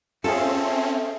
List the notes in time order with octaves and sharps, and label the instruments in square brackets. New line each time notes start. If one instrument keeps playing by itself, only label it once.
[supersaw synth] C4 C#4 [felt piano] F4 G#4 [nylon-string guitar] A4 [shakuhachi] E5